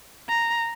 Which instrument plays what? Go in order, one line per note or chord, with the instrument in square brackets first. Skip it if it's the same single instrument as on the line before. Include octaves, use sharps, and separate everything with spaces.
[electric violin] A#5